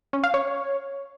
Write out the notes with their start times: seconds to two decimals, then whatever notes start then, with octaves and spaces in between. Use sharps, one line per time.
0.13 C#4
0.24 F5
0.34 C#5